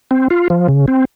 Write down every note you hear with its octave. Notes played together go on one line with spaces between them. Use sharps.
C4
F4
F3
C#3
C4